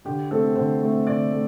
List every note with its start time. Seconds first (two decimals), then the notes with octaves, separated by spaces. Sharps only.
0.05 D3 G4
0.31 A3 C4 A4
0.56 D3 C5
0.81 A3 C4
1.06 D3 D5
1.32 A3